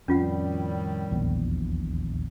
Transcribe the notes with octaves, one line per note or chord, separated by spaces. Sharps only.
F2 A2 D#3 G3 C#4 F4 F#5
D#1 A#1 E2